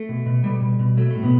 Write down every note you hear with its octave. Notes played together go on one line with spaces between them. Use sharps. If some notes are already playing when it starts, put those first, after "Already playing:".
Already playing: A3
B2
B2
B2 G3
B2
B2
F#3 A3
A2 A3
B2 B3